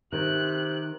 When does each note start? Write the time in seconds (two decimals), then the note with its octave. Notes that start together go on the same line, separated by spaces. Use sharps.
0.12 C3 D#3 F#6